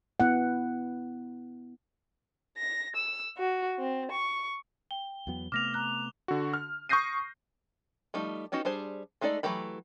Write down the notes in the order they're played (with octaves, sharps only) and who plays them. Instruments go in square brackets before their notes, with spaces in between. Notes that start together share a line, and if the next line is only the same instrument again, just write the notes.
[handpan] B3 E4 F#5
[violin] A#6
E6
F#4
C4
C#6
[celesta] G5 [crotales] G7
[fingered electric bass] E2 F#3 B3
[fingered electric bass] C3 A3 B3 [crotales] D6 F7 [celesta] F6 A#6
[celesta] A#5 F#6
[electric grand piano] D3 F#4
F6
C#6 D#6 G6 A#6 C7 D#7
[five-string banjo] F3 G3 A3 D#4
B3 C#4 D#4 F#4 G4
G3 D4 G#4 C5
G#3 A3 D#4 A4 D5
E3 F#3 A3 G4 B5